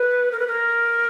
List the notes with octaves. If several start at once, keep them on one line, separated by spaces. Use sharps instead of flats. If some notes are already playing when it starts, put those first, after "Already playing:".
Already playing: B4
A#4
B4
A#4